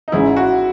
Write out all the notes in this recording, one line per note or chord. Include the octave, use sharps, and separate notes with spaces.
D#4
G#1 G#2 E3 G#3 C#4 E4
F#4